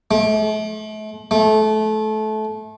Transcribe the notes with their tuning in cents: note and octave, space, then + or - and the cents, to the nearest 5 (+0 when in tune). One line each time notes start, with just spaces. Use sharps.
A3 -40
A3 -25